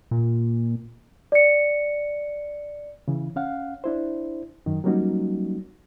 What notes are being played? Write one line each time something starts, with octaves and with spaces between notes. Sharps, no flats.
A#2
D5 C#7
C#3 E3
C#4 F5 F#5
D4 E4 C5
F#2 D#3
F#3 G3 A#3 C#4 D#4 F#4